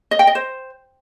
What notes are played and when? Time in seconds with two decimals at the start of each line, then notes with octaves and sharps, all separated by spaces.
0.11 D#5
0.19 G5
0.27 D#5
0.35 C5